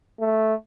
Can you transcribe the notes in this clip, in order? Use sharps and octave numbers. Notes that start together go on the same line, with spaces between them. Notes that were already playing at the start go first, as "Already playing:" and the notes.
A3